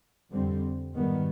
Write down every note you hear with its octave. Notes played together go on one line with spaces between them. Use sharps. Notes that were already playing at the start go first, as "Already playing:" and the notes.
F2 D3 G3 C4
G#2 D#3 G3 B3